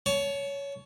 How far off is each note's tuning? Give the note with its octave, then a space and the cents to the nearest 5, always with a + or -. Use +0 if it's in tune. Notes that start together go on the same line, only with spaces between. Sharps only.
C#5 +15 A5 -25